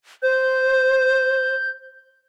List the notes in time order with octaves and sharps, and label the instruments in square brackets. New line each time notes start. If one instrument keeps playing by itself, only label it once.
[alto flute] C5 [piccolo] G6